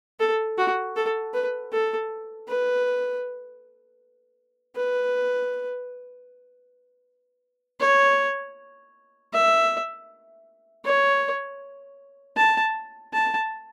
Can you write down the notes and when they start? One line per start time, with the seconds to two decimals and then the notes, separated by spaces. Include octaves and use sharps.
0.20 A4
0.58 F#4
0.96 A4
1.34 B4
1.72 A4
2.48 B4
4.76 B4
7.81 C#5
9.33 E5
10.85 C#5
12.37 A5
13.13 A5